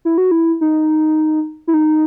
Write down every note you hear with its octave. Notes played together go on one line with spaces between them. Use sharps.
E4
F#4
E4
D#4
E4
D#4